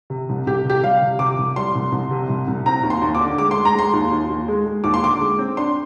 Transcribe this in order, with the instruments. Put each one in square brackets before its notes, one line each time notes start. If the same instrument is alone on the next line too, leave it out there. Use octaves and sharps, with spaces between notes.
[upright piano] C3
C2
C2 G4
C3 G4
G3 F5
C3
C3 D6
C2
G3 C6
C2
C2
C3
C2
C2
C4 A#5
D#2
C6
D#2
D6
D3
G#3 D6
C6
G#3
A#5
G#3 C6
D#2
D#2
D#2
G#3
G#3
D#2 D6
C6
D3 D6
G#3
C4
D4 C6